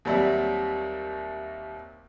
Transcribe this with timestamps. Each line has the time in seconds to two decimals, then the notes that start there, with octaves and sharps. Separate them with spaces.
0.05 D#2 F#3 G3 C4 E5